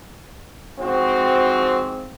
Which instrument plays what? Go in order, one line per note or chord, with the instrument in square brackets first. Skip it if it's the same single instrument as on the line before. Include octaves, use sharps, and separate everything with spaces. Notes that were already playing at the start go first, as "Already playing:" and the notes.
[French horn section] G#2 F3 C4 [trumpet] F#4